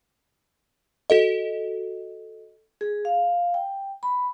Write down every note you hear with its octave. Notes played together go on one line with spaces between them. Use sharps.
F#4 A4 D#5
G#4
F5
G5
B5